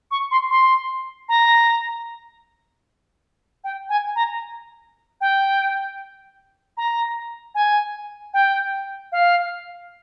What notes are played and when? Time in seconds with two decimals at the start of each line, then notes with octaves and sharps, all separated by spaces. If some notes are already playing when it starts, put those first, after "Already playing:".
0.11 C#6
0.31 C6
0.51 C6
1.29 A#5
3.64 G5
3.89 G#5
4.16 A#5
5.21 G5
6.77 A#5
7.55 G#5
8.34 G5
9.12 F5